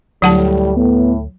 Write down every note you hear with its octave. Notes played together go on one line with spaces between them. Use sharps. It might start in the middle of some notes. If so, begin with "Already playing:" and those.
D2 A2 F#3 G3 F#5 A5
A2 B3